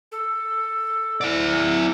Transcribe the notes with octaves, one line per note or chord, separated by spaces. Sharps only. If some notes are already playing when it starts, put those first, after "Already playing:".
A4
E4 D5 F#5